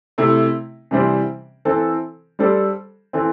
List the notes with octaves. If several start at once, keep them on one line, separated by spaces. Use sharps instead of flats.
C3 A3 E4
C3 E3 G3 D4 C5
E3 C4 A4 C5
G3 D4 A4 C5
E3 C4 A4